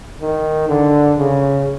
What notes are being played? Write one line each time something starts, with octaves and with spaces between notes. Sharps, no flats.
D#3
D3
C#3